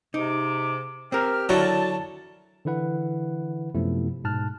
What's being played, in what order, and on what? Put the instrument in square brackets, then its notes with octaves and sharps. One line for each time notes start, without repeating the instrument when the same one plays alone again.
[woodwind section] G#2 C3 D6 [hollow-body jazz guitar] D#4
[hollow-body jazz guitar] C4 A#4 [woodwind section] G4 G5 F6
[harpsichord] D3 F#3 E4 [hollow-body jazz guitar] F#4 D5 [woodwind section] A5
[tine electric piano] D3 E3 E4 B4 F#5
F#2 C3 F3 A3 B3 E4
G#2 B2 A5 F6 F#6